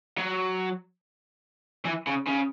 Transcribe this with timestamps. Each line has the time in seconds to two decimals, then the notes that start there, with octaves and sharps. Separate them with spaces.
0.17 F#3
1.85 E3
2.07 C#3
2.27 C#3